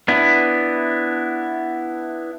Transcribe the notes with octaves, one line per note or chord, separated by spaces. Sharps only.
B3 D4 E4